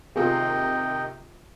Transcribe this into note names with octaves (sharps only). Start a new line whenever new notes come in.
C3 D#3 A#3 F4 G#4 D#5 G5